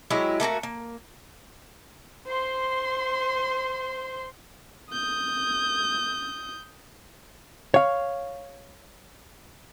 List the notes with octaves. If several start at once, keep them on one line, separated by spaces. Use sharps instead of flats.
F#3 G#3 E4 G4
A3 A#3 C4 F#4
A#3
C5 C6
D#6 G6
C#5 F5